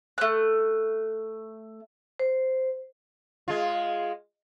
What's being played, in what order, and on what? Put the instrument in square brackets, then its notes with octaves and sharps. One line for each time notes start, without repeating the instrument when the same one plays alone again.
[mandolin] A3 F#6
[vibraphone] C5
[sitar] G#3 F4